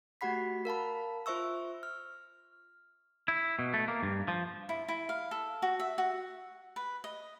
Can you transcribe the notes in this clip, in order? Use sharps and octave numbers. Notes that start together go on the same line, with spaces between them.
A3 F#4 G4 F#5 B5 B6
A#4 F5 A5 B5
F4 C5 E5 C#6 E6
F6
E4
B2
A3
A#3
G2
F3
E4
E4
F5
A4
F#4
E5
F#4
B4
D#5